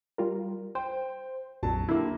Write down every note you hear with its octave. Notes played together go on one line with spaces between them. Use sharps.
G3 F4 A#4
C5 G5
A#1 F2 F#3 A5
D3 A#3 E4 G4